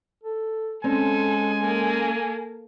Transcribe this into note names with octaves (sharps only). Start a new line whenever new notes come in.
A4
G#3 C4 C#4 A4 G#5
A#3 A4